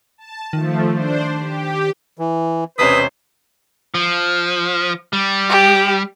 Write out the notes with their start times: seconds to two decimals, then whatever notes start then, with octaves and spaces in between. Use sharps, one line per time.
0.18 A5
0.53 D#3 F3 A3
0.94 D4 C5
1.39 G4
2.19 E3
2.79 E1 C3 C#4 B4 C5 D#6
3.94 F3
5.13 G3
5.49 G4